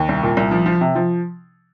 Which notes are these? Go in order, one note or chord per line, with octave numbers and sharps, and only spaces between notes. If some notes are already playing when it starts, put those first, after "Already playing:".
Already playing: D#2
C2
A#2
C2
F3
F3
C3
F3